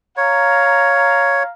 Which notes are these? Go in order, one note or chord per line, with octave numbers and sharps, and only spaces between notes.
C#5 F5 A#5